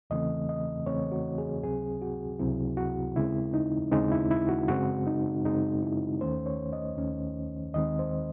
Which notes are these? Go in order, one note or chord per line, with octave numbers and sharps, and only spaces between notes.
E2 C#3 E3 A3 C4 D#5
D#5
E2 C#3 E3 A3 C4 C#5
F#4
G#4
C#2 C3 F#3 C4 G#4
F#4
C#2 C3 F#3 C4 E4
F#4
D#2 C#3 G#3 C4 E4
D#4
D#2 C#3 G#3 C4 D#4
E4
E4
F#4
F#2 C#3 G#3 C4 F#4
D#4
F#2 C#3 G#3 C4 D#4
E4
D#2 D#3 A3 C#4 C5
C#5
D#5
D#2 D#3 A3 C#4
D#2 D#3 G#3 C4 D#5
C5